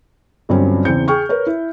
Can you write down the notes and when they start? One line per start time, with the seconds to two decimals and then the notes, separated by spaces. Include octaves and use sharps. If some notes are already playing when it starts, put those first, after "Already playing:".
0.49 G1 G2 F#3 C4 C#4
0.85 E2 C#3 C4 G6 C#7
1.08 G#4 G5 C#6 F6
1.29 A#4 B4 C#5
1.46 E4